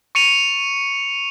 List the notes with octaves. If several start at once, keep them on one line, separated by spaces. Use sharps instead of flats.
C#6 C#7 D#7 F7